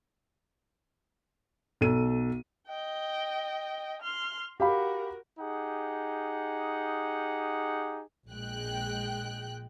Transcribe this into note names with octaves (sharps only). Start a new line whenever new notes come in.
B1 A4 D#7
D#5 G5
C6 F6
F#4 G4 A#4 F5 B5
D#4 G4 G#4 F#5
A#1 G#3 G5 F#6